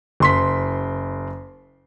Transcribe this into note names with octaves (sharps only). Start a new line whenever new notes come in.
F#1 C6 B6